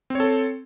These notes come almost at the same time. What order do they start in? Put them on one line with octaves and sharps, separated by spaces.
C4 C#5 A4